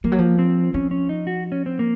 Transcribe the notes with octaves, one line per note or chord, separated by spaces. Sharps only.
F3 A#3
F#3
F3
C4
F3 C#4
C#4
D#4
F#4
C#4
C4
A#3